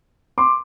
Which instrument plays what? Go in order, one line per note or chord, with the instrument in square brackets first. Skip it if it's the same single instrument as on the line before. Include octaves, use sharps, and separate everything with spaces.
[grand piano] C6 D6